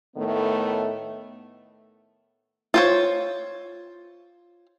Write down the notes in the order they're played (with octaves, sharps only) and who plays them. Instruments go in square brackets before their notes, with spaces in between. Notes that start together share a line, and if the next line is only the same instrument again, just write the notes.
[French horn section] A2 D#3 A3 B3
[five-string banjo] F4 C5 C#5